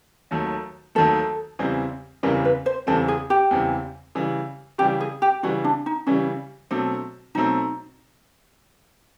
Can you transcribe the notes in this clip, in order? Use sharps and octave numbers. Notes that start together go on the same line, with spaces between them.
D#2 D#3 F#3 A3
D#2 D#3 F#3 A3 A4
E2 C#3 E3 G3 C4
E2 C#3 E3 G3 C4 A#4
B4
C5
E2 C#3 E3 G3 C4 A4
G#4
G4
E2 C#3 E3 G3 C4
C#3 E3 G3
C#3 E3 G3 G4
G#4
G4
C#3 E3 G3 F#4
D4
D#4
C#3 E3 G3 C#4
B2 F#3 A3 C4 D4
B2 F#3 A3 C4 D#4